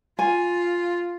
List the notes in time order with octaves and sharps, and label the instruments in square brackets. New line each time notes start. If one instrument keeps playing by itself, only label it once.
[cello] F4 [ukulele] G#5